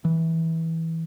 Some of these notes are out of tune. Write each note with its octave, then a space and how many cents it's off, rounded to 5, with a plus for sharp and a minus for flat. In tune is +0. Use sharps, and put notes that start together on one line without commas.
E3 -20